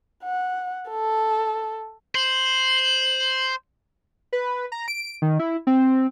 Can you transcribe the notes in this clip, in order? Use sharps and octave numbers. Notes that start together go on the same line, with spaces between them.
F#5
A4
C5 F#7
B4
A#5
D7
D#3
E4
C4